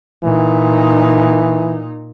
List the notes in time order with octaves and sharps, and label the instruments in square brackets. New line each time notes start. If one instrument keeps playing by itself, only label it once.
[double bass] A#2 D#4 [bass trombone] E3